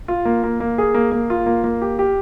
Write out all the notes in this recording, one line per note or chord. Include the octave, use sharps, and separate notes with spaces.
F4
A#3
A#3
A#3
G#4
A#3
A#3
F4
A#3
A#3
G4
G4